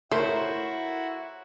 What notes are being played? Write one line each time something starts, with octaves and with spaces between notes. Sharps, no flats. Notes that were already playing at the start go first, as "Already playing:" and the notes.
A3 E4 F#4 A#4 C5 C#5